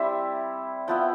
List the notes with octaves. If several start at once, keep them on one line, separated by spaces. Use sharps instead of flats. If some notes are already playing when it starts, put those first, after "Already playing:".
Already playing: G3 C4 E4 E5
F3 B3 E4 G5